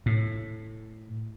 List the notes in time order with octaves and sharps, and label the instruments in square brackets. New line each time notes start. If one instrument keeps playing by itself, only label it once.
[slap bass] A2